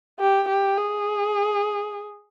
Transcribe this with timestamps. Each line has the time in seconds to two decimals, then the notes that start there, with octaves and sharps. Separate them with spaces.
0.19 G4
0.48 G4
0.77 G#4